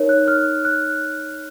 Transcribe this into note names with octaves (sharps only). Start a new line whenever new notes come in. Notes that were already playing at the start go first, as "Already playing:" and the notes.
Already playing: D#4 A#4 C#5
F#6
F6
F#6